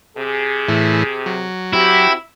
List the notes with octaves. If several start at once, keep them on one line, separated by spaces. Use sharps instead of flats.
C3 G#4
A2 E3
F#3
C4 E4 F#4 G4